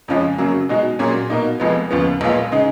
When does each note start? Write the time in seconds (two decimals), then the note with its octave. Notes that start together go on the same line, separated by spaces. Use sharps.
0.08 F2 C#3 F3 G#3 C#4
0.38 F#2 C#3 F#3 A#3
0.69 B2 G#3 D#4 F#4
0.99 A#2 F#3 C#4 G#4
1.30 B2 A#3 D#4
1.60 F1 F2 F3 G#3 B3
1.91 D#2 C#3 F3 B3
2.21 B1 A#2 G#3 B3 F4
2.52 C#3 G#3 D#4